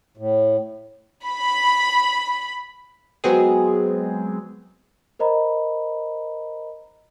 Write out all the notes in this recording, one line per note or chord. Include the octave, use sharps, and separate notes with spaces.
A2
B5
F#3 G#3 B3 C4 G#4
A#4 C5 D#5 A#5 B5